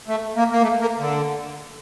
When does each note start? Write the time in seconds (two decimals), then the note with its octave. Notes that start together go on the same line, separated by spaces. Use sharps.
0.08 A3
0.36 A#3
0.51 A#3
0.62 A3
0.81 A#3
0.99 D3